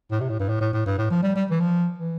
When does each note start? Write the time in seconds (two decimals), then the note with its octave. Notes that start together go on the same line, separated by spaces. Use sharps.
0.11 A2
0.21 C3
0.29 A2
0.39 G2
0.49 A2
0.61 A2
0.73 A2
0.86 G2
0.98 A2
1.10 F3
1.23 G3
1.36 G3
1.51 E3
1.60 F3
1.98 E3